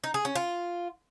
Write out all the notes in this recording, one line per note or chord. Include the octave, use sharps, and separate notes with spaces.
D#4
G#4
C#4
F4